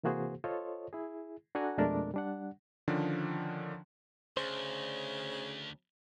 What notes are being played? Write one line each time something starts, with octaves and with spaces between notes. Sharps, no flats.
C3 E3 A#3 F#4 G#4 C5
F4 A4 C5 C#5 D#5
E4 G#4
D4 F#4 A4 F#5 G#5 A#5
F2 B2 G#3 A3 D4 A#4
G3 D4 F#5
D3 D#3 F3 C#4 D4
D2 C#3 C5